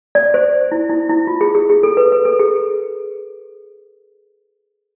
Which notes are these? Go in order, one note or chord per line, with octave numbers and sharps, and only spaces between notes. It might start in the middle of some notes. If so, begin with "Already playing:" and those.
D5
C5
E4
E4
E4
F4
G#4
G#4
G#4
A4
B4
B4
A4
G#4